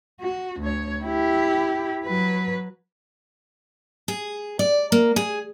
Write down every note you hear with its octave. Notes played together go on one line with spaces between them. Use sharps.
F#4
D2 C#5
E4 G4
F#3 B4
G#4
D5
A#3
G#4